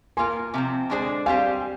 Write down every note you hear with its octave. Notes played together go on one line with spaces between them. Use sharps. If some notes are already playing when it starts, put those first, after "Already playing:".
A#3 F4 A#4 G#5 C6
C3 F3 C4
D3 G#3 D4 G#4 C5
G3 C4 G4 C5 F5 G#5